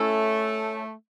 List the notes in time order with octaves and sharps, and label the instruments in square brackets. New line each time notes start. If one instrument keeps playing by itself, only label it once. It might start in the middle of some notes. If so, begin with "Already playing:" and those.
Already playing: [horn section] A3 [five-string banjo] C#4 E4 A4